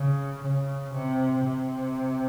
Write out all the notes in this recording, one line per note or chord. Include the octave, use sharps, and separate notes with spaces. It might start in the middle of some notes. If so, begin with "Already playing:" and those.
Already playing: C#3
C#3
C3
C3